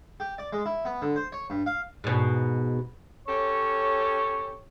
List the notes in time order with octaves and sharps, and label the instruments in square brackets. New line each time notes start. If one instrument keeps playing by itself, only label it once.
[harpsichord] G4
D5
G#3
E4
B3
D3
C5
C#5
G2
F5
[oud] G#2 B2
[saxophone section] C#4 G4 A4 [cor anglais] C#5